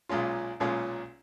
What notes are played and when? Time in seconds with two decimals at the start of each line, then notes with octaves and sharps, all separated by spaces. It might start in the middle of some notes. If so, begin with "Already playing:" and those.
0.09 B1 A#2 G#3 C#4 F4
0.60 B1 A#2 G#3 C#4 F4